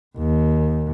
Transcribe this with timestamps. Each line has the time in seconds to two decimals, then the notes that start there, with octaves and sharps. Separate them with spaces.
0.18 D#2